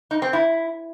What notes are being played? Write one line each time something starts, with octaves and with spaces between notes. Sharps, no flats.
D#4
C4
E4